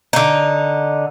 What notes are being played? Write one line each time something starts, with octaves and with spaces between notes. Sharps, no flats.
D3 D#4